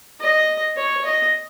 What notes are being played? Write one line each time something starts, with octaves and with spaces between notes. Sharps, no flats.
D#5
C#5
D#5